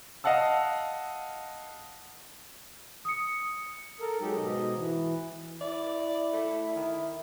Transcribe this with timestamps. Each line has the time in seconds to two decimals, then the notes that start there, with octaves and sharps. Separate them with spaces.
0.24 D#5 F5 F#5 A5 E6
3.05 D#6 C#7
4.01 A4 A#4
4.20 F#3 G#3 D#4 G4 A4
4.36 G#2 B2 D#5
4.76 E3
5.61 E4 D5
6.33 A3
6.76 D#3